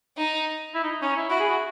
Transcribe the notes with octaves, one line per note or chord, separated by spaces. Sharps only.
D#4
E4
D#4
C#4 D#4
E4
E4 F#4
G#4
F#4